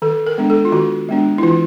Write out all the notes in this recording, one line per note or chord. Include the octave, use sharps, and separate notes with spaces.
D#3 A4
A#4
G#3 B3 D4
A4
F4
D#3 F#4
G#3 B3 D4
E4
E3 F4